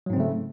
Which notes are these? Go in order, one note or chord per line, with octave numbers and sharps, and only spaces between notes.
G#2 C#3 F#3 A3 C4